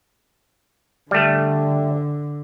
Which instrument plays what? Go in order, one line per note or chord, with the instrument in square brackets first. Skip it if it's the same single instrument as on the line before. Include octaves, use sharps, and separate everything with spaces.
[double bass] D3 [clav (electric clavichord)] G3 A3